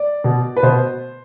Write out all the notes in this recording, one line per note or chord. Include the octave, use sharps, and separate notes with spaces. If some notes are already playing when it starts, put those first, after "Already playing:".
Already playing: D5
B2
B4
B2 C5